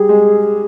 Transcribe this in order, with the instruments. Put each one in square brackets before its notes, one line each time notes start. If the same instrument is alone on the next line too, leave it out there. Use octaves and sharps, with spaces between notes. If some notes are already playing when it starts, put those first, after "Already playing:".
Already playing: [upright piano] G3 [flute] G#4
[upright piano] G#3